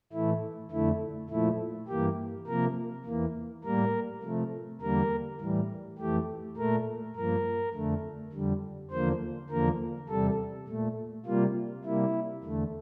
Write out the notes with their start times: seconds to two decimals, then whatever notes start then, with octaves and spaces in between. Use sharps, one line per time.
0.12 A2 E3 A3 E4
0.71 F2 D3 A3 E4
1.29 A#2 F3 A3 E4
1.88 G2 E3 A#3 G4
2.47 C3 F3 A#3 A#4
3.05 E2 E3 A#3
3.64 A2 G3 A#3 A#4
4.23 C3 F3 A3
4.81 E2 D3 G3 A#3 A#4
5.40 A2 E3 G3
5.98 F2 E3 A3 G4
6.57 A#2 A3 A#4
7.16 G2 F3 A#3 A#4
7.74 F2 D3 A3
8.32 F2 D3 G3
8.91 E2 D3 F3 A#3 C5
9.50 E2 D3 F3 A#3 A#4
10.09 E2 C3 G3 A4
10.68 A#2 A3
11.26 C3 G3 A#3 F4
11.84 C3 G3 A#3 E4
12.43 E2 D3 A3